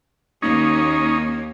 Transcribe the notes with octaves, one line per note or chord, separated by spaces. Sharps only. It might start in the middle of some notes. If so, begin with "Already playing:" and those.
D#2 A#3 C#4 D#4